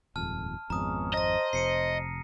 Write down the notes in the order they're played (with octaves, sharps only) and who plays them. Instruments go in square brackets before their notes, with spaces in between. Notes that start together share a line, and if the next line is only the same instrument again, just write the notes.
[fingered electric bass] D#1 F2 G#2 [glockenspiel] A5 F6
[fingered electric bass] G#1 F2 [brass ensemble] G#3 B3 C#4 [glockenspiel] A#5 D#6
[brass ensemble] C5 [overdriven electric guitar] D#5 [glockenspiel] A#5 A#6
[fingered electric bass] F1 C3 [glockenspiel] C7 C#7 D#7